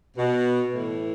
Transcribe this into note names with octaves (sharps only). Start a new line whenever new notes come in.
B2
A2 E3